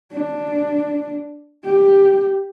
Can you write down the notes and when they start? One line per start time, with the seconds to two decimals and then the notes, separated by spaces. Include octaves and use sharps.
0.12 D4
1.64 G4